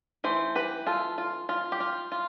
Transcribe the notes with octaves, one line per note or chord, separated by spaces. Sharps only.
E3 A3 C5
G4 B4
F4 A4
F4
F4
G4
F4
F4